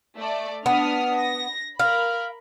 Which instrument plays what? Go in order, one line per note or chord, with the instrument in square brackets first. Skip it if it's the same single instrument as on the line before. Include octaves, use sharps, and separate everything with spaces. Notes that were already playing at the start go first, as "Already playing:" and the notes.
[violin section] A3 D5
[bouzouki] B3 [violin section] D4 D#6 F6
[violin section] A#6
[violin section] A#4 B5 [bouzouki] F5